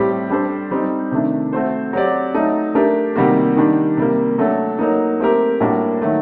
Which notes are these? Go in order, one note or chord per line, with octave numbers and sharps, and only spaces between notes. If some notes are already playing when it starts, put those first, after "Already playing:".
Already playing: A2 G3 C4 G4
G3 D4 A4 C5
G3 C4 D#4
C3 D#3 A3 D4
A3 C4 F#4 C5
F#3 C4 G4 D5
F#3 A3 D#4 A4
A3 D4 G4 A#4
C3 D#3 G3 A#3 F#4
D#3 G3 D4 G4
C3 G3 A#3
F#3 A3 D4 A4
F#3 A#3 D#4
A3 C4 G4 A#4
A2 G3 A#3 D4 F#4
D#3 F#3 A3